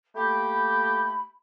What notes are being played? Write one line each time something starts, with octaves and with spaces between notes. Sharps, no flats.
A3 A#3 G4 B5